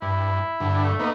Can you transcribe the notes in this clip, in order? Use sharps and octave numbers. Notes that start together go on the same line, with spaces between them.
G2 E4
G2 D3
A3
A#3 B3 D#4